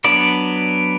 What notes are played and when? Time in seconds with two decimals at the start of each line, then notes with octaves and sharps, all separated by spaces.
0.04 F#3 B3 D4 D5